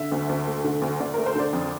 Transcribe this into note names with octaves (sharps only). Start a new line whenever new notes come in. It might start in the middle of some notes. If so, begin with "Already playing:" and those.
Already playing: D3 E5
D2
D2
A3
D3
D2
D2 D5
A3 A#4
C5
D3 D5
F2